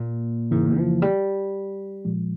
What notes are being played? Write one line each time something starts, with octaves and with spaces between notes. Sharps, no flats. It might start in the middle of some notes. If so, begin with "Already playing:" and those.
Already playing: A#2
F2 G#2 C#3 E3 A#3 E4
F3
G3
A#2 F3 G#3